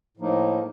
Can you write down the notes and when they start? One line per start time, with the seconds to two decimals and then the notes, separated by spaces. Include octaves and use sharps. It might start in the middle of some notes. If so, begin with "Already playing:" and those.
0.17 A2 F3 A#3 D#4